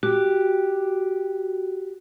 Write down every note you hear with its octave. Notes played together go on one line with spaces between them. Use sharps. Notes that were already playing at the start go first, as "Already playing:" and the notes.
F#4 G4